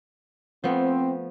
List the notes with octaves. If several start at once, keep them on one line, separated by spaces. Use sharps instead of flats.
F3 A3 B3 C4